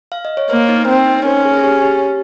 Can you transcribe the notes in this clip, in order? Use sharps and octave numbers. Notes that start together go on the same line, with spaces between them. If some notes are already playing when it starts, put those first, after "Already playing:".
F5
D#5
C#5
A#3 C5
D#4
C4
D#4
C5
C#4 A#4
G#4
G#4
G4
G4